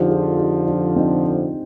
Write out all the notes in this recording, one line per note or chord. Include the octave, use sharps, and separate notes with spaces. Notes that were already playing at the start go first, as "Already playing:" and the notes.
Already playing: F2 D3 F3 D#4 G4
F4 G#4
D#4 G4
D4 F4
C4 D#4